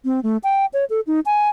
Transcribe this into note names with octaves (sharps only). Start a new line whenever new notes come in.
C4
A3
G5
C#5
A4
D#4
G#5